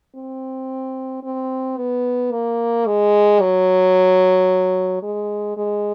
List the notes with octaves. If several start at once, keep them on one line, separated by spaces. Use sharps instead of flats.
C4
C4
B3
A#3
G#3
F#3
G#3
G#3